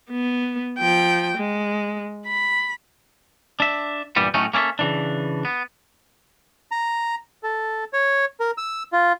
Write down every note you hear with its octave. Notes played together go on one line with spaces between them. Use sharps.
B3
F3 G5
G#3
B5
D4 E5
G2 A#2 E3 G3 B3
A2 F#3 A3 C#4 D#4
A#3 C#4 E4 A4 E5
C#3 E3 D4
B3
A#5
A4
C#5
A#4
E6
F4